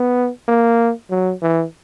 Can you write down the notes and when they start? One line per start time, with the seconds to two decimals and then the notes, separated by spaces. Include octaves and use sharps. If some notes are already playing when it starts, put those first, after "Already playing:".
Already playing: B3
0.48 A#3
1.11 F#3
1.42 E3